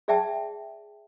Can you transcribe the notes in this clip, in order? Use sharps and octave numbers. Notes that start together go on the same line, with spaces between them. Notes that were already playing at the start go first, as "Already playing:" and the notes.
G#4 D5 E5 G5 A5